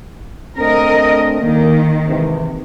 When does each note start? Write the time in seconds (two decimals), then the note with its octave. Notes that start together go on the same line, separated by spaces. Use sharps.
0.58 A3 C4 D4 A#4 D#5
1.42 D#3 A#3
2.07 G#2 C3 E3